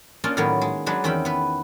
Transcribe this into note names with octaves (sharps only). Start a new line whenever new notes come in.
A#3 C#4 D4 F4 D#5
A2 D#3 F#3 A#3 B3
G#3
F#3 G#3 D4 B4
E2 D#3 C4 C#4 G5 B5
B3 B4